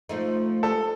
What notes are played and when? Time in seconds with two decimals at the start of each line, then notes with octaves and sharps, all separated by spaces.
0.09 F3 A3 D#4
0.63 A4